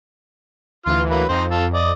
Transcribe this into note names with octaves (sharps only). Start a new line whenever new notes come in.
D2 E3 F4 C6 F6
F#3 A#3 B4
F2 C4 D#4 C5
F4 A4
D5 D#5